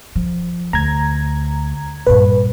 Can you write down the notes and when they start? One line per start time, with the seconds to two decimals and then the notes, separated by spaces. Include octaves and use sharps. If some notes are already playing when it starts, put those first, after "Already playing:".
0.16 F3
0.73 D2 A#5 G#6
2.07 G2 A#2 B4